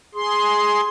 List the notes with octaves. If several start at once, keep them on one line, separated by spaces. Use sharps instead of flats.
G#4 C6